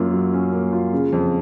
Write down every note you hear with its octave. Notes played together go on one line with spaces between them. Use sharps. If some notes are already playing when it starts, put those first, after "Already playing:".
Already playing: F#2 A#3 F4
F#3
C#4
A#3
F4
C#3
F2